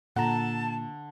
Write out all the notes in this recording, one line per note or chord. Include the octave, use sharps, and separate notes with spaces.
A#2 D3 F#5 A5 A#5